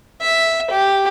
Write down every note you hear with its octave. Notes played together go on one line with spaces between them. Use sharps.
E5
G4